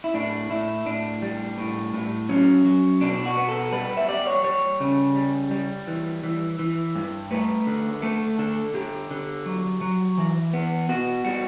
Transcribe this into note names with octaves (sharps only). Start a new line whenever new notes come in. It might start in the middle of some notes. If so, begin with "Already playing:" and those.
E4
A2 D4
A2 E4
A2 D4
G3
A2
A2
F#3 C#4
F#3
B2 D4
F#4
B3
A4
G3 B4
E5
G3 D5
C#5
G3 C#5
C#3
G3
G3
E3
E3
E3
G2
A3 B4
D3
A3 A4
D3 A4
D3 G4
D3
F#3
F#3
E3
B3
B3 F#4
G3 F#4